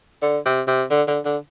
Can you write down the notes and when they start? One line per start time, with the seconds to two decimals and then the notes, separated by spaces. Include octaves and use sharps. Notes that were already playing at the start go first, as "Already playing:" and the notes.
0.22 D3
0.46 C3
0.68 C3
0.91 D3
1.08 D3
1.25 D3